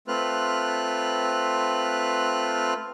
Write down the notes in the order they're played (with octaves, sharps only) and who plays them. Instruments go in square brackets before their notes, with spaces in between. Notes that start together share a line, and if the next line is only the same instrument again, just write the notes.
[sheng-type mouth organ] A3 C4 F4 B4 F6 F#6